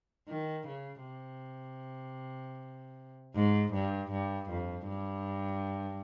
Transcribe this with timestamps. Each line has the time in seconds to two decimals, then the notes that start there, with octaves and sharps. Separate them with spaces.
0.28 D#3
0.67 C#3
1.05 C3
3.35 G#2
3.73 G2
4.11 G2
4.49 F2
4.88 G2